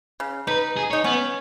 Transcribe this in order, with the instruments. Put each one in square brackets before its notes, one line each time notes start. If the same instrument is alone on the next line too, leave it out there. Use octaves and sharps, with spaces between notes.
[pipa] C#3
[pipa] D#4 [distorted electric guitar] B4
[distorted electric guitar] G#4
[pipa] D#4 [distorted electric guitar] C#5
[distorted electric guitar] B3 [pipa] C#4